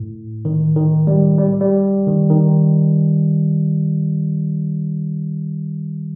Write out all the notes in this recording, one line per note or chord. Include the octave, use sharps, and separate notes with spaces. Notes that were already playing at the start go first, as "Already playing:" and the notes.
Already playing: A2
D#3
D#3
G3
G3
G3
D#3
D#3